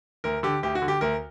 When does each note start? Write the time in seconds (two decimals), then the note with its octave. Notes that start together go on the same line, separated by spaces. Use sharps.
0.24 D2 A#4
0.43 D3 G4
0.63 D2 G4
0.75 F#4
0.82 D3
0.88 G4
1.01 D2 A#4